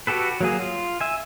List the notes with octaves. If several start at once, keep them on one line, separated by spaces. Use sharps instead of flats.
F#4 G4 A4 B4
F#3 A#3 G#4
F4
E5 G#5